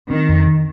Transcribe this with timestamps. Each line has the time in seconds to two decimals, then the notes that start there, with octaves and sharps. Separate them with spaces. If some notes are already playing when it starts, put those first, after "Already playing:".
0.10 D#3 C4
0.29 F2
0.47 D#3